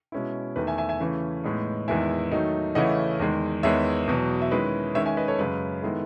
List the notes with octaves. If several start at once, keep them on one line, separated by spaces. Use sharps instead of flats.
B2 G#3 C#4 E4
E2 D#3 A3 B4
E5 G#5
E5 G#5
E5 G#5
C#3 E3 A3 C#4 E4
A2 G#3 B3 D#4
E2 D#3 G#3 B3 E4 E5 G#5
D#3 F#3 A3 D#4
C#3 E3 A3 C#4 E4 D#5 F#5
E2 D#3 G#3
E2 D#3 G#3 B3 C#5 E5
E2 B2 F#3
E5
D#3 G#3 C#4 E4 B4 D#5
D#3 G#3 C#4 C#5 E5
E5 G#5
B4 D#5
A4 C#5
F#2 C#3 G#3 B4
D#3 G#3 B3 E4 A4